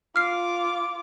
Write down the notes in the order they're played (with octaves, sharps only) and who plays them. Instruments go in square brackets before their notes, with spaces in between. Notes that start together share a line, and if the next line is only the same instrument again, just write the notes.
[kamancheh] F4 D6 [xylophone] F6 C7